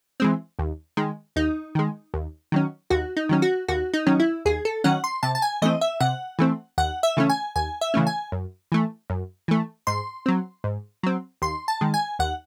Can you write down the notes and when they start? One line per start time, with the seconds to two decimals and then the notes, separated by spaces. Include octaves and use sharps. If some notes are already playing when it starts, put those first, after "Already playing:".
0.20 E3 G#3 C4
0.59 D#2
0.97 D#3 G#3
1.36 D#2 D#4
1.75 D#3 G#3
2.14 D#2
2.52 D#3 F#3 C#4
2.90 D#2 F#4
3.17 D#4
3.29 D#3 F#3 C#4
3.42 F#4
3.68 D#2 F#4
3.94 D#4
4.07 D#3 F#3 C#4
4.20 E4
4.45 D#2 G#4
4.65 A4
4.84 D#3 F#3 C#4 F#5
5.04 C6
5.23 C3 A5
5.35 A5
5.42 G#5
5.62 E3 A3 C4 D#5
5.81 E5
6.00 C3 F#5
6.39 E3 A3 C4
6.78 D#2 F#5
7.03 E5
7.17 C#3 E3 A3 C#4
7.30 G#5
7.56 D#2 G#5
7.81 E5
7.94 C#3 E3 A3 C#4
8.07 G#5
8.32 F#2
8.72 E3 A3
9.10 F#2
9.48 E3 A3
9.87 G#2 C6
10.26 F#3 C4
10.64 G#2
11.03 F#3 C4
11.42 D#2 C6
11.68 A5
11.81 D#3 G#3
11.94 G#5
12.19 D#2 F#5